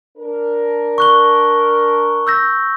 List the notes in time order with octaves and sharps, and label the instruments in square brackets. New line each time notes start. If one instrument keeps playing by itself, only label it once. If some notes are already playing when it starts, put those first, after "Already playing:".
[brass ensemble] D4 A#4
[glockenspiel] C#6 F#6 G7
E6 G6 A#6